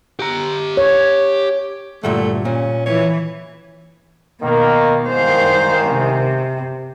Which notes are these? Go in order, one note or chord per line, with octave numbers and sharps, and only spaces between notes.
G4 A#5
C#5
D2 G2 A#2 A3
A#2 C#4
E3 C#5
B2 D#3 A#3
C2 G#2 D#3 C5 F5
C3